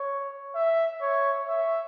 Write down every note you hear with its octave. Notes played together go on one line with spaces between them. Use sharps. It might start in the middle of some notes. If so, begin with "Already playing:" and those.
Already playing: C#5
E5
C#5
E5